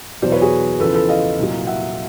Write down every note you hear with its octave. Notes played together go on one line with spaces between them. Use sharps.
E2 B2 F#3 C5 D5
B4 C#5
F#4 G#4
E2 C#3 F3 A4 B4
A4 B4
D#5 F5
C2 A#2 F#3
E5 F#5